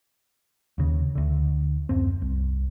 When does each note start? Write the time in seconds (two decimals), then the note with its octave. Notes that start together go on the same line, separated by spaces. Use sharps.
0.78 D#2 C#3
1.15 D2 D3
1.89 D1 F#2 C4
2.22 C2